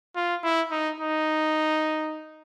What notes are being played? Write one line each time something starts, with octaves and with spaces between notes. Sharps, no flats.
F4
E4
D#4
D#4